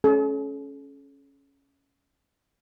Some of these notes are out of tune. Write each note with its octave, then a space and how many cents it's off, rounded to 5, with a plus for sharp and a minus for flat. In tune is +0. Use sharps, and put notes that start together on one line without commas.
C#4 +0 A4 -45